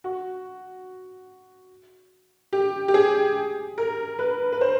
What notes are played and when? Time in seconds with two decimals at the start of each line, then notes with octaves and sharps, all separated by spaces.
0.04 F#4
2.53 G4
2.88 G4
2.94 G#4
3.78 A#4
4.19 B4
4.52 B4
4.61 C5